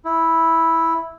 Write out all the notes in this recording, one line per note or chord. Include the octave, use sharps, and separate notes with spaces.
E4